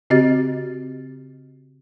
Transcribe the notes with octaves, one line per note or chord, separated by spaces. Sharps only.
C#3 C4 F#4 G4 D#5 A6